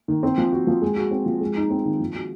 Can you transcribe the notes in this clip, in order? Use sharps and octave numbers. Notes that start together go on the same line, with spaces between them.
D#3
C4
F3
F#4
F3
G#3
F#4
C4
F3
G#3
D#4
C4
D#3
F3
F#4